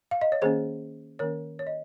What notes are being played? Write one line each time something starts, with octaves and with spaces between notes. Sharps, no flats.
F5
D#5
C#5
D#3 A#3 C#4 G#4 C5
D#3 A#3 C#4 A#4 C#5
C#5
D#5